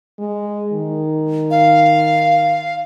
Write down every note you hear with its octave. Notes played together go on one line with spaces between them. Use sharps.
G#3
D#3
F5